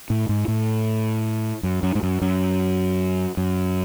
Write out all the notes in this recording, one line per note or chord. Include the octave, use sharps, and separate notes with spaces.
A2
G#2
A2
F#2
F#2
G#2
F#2
F#2
F#2